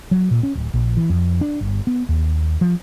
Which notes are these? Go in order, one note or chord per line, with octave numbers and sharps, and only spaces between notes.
F#3
A#2
C#4
D1
A#1
E3
F2
D4
G1
B3
D#2
F3